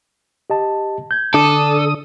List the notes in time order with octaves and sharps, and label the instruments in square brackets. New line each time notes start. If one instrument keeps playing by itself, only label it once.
[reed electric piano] G4 D#5 A5
G6 G#6
[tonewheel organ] D3 D#6 [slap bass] D4 [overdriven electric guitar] A4 [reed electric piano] D6